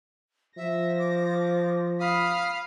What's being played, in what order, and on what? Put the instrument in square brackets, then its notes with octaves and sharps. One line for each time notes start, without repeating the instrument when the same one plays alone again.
[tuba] F3 [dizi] E5 [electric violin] A#6
[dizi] D6
[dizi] F5 [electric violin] B5 D#6